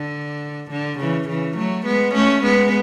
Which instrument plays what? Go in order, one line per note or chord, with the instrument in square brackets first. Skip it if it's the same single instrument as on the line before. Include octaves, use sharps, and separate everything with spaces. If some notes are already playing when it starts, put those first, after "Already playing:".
Already playing: [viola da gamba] D3
D3
C#3 E3
C#3 E3
F#3 A3
G#3 B3
A3 C#4
G#3 B3